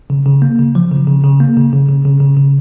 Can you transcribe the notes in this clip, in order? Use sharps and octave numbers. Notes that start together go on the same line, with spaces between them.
C#3
C#3
A#3
C#3
F3
C#3
C#3
C#3
A#3
C#3
C#3
C#3
C#3
C#3
C#3